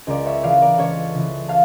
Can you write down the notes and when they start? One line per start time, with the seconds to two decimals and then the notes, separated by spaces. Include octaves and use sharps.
0.07 C#2 A#4 D5
0.26 C#5 E5
0.43 C#3 E3 D5 F5
0.61 A#4 D5
0.78 C#2 A4 C#5
1.14 C#3 E3
1.49 F5 A5